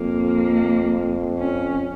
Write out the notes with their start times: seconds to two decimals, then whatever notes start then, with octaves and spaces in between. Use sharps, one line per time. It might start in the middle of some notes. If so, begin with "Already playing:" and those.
Already playing: F2 A#3
1.38 C#4